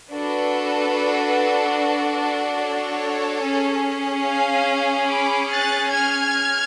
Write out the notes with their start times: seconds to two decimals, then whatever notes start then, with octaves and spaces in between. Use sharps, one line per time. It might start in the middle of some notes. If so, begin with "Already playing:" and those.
0.11 D4 F#4 A4 B4
2.60 A4 C#5
3.43 C#4 G#4
4.25 F5 G#5
5.08 B5 D6
5.50 F#6 A6
5.92 F6 G#6